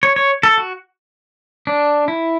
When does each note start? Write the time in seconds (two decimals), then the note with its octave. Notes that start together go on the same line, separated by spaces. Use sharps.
0.03 C#5
0.16 C#5
0.43 A4
0.58 F#4
1.67 D4
2.08 E4